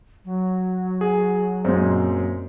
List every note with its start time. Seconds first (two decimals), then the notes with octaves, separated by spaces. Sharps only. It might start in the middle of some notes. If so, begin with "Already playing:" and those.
0.25 F#3
1.01 G#4
1.65 F#2 A#2 G#3 C4